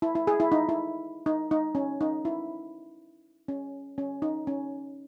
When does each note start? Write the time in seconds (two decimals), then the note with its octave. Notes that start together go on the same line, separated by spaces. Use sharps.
0.02 E4
0.15 E4
0.27 G#4
0.40 E4
0.52 D#4
0.69 E4
1.26 D#4
1.51 D#4
1.75 C#4
2.01 D#4
2.25 E4
3.48 C#4
3.98 C#4
4.22 D#4
4.47 C#4